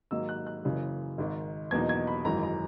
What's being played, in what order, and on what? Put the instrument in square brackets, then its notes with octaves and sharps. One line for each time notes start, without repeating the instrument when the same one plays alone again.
[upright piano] G#2 D#3 F#3 A#3 E6
F#6
F#6
F#1 F#2 C#3 E3
G#1 G#2 D#3
E2 B2 F#3 A#3 D#4 G#6
G#6
B5
G#1 F#2 E3 G#3 A#5
A#5